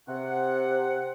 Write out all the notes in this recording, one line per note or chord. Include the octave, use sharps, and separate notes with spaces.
C3 F#5